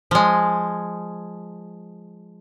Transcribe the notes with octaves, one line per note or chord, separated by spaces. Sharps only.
F3 G#3